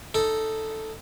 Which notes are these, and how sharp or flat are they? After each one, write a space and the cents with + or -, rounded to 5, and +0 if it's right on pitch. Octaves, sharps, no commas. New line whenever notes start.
D#4 +0 A4 +0